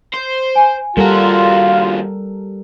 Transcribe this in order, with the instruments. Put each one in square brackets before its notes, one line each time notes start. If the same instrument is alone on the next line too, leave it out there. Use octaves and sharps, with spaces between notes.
[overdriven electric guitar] C5
[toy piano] G#5
[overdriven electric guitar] D#2 F#4 [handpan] G3 A4 A#4 [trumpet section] F4